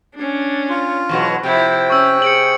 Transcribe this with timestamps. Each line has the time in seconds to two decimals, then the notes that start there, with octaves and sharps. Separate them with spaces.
0.15 C#4 D4
0.69 F4
1.09 E2 B2 F#3
1.43 C3 F3 E4 G5
1.90 C#4 C#6 E6
2.22 G#4 C#7 D7 F#7